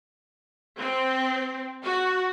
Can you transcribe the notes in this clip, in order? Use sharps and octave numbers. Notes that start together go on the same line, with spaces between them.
C4
F#4